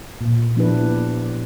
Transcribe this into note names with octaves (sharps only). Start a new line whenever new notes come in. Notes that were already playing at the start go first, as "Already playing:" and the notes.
A#2
F3 B3 D4 E4 G4 B4